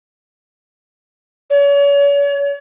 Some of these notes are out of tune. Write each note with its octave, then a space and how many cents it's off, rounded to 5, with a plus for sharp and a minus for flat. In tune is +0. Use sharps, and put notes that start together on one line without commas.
C#5 +40